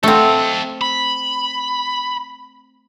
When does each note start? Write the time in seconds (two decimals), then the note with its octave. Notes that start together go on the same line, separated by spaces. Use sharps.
0.03 A3 C4 A4 F5
0.81 B5